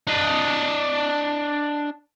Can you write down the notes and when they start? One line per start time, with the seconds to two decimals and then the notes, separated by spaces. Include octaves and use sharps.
0.07 D4 D#5